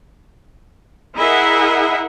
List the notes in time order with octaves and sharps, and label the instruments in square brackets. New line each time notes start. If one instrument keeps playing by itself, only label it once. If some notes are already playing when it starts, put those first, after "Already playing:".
[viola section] E4 G#4 A#4 D#5 E5 F#5